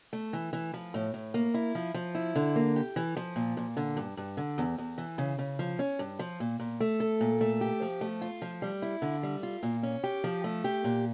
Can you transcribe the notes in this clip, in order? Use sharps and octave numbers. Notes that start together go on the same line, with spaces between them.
A3
E3
E3
F3
A2
A2
A#3
E4
F3
F3
E4
D3
A#3
G4
E3
F3
A#2
A#2
D3
G2
G2
D3
E2
E2
E3
C#3
C#3
F3
C#4
G2
F3
A#2
A#2
A3
A4
A#2
A3
G4
F3
A3
F4
F3
G3
E4
D3
G3
F4
A#2
C#4
G4
F3
A3
G4
A#2